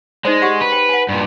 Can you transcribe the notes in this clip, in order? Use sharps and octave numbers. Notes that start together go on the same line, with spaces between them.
G#3 D#4 C5 D5
G4 F#5
B4
G5
F#5 G#5
G2 A#2